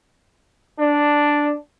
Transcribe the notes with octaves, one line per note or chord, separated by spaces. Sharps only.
D4